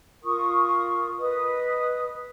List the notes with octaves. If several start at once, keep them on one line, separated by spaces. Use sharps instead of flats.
F4 A#4 C#6 D#6
B4 D#5 D#6